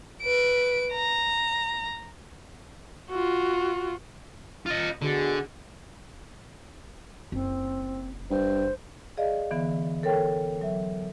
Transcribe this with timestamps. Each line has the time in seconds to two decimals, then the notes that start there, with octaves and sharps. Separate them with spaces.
0.22 B4 D7
0.92 A#5
3.10 F4 F#4
4.66 F4 D#5
5.02 B2 D3 F#4 G#4
7.32 F#1 C4
8.30 G2 C5
9.17 G#4 D5 D#5 F5
9.51 D3 E3 B3
10.03 A4 A#4 C#5 G5
10.61 F#3 E5